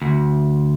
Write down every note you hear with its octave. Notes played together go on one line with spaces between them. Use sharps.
D2